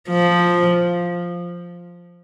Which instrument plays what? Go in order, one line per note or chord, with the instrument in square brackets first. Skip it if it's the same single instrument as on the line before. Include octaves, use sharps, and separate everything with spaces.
[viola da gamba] F3